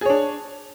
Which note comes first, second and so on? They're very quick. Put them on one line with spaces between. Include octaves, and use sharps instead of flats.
G#4 C#5 D4